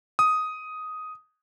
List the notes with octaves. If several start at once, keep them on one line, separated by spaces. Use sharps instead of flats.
D#6